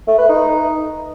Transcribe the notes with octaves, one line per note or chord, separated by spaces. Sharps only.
A3
B4
D#4